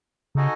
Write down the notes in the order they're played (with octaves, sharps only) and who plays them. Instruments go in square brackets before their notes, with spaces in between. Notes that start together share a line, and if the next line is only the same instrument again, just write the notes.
[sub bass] C#3 [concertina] D#4 F#4 A4 D#5 G#5